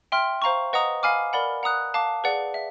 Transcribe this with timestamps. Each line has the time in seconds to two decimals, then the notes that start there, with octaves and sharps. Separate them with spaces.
0.12 E5 G5 C6 F6
0.42 C5 F5 A#5 C#6
0.73 B4 D#5 F#5 A#5 D#6
1.03 F5 G#5 B5 D6 F6
1.33 A#4 D5 F#5 B5
1.63 F#5 A#5 D#6 F#6
1.94 F5 A5 D6
2.24 G#4 B4 D5 F#5
2.54 E5